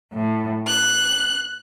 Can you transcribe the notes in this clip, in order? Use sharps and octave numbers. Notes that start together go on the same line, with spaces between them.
A2
F#6